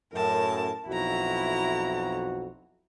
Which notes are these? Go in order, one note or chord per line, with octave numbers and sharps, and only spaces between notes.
F#2 A2 A#4 A5
B1 F2 E4 F#4 A#5